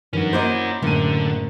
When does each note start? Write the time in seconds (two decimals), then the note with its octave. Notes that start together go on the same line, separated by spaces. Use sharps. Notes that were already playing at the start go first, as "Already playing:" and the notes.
0.13 G2 D#3 F3 C#4 F#4 B4
0.33 A#3 E4 C5 D#5 C6 D6 G6
0.82 F#1 A2 D3 D#7